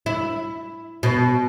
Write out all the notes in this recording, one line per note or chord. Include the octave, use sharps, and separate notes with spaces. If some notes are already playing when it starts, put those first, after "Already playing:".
E4
B2